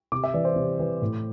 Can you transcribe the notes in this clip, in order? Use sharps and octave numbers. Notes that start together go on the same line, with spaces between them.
C3 D6
E5
E3 D5
C5
C3
E3
A2